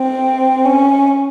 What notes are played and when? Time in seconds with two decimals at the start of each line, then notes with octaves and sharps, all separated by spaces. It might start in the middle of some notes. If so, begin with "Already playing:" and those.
Already playing: C4
0.65 C#4